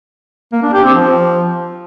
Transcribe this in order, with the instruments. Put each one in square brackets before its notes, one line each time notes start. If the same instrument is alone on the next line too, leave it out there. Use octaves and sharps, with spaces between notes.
[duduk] A#3
D4
G4
C4
F3